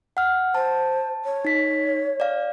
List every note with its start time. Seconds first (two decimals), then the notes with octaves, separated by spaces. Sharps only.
0.17 F#5 F6
0.55 C5 A5
1.25 C#5
1.45 D#4 B6
2.20 D5 F5